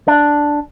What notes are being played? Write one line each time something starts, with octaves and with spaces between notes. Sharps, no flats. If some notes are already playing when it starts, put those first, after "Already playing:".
D4